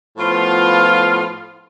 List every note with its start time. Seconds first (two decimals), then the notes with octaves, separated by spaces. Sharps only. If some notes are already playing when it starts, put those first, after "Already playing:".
0.18 A2 F3 B3 F4